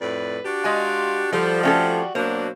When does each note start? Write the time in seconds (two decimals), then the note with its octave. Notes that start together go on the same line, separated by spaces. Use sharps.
0.01 F2 A2 B4 D5
0.45 D4 F#4 G4
0.64 G#3 F5 G#5 C6
1.32 F3 G3 F#4 A4 C5
1.63 A3 C#4 F#4 G4 A4 D5
2.15 B2 F#3 A#3 D4 C5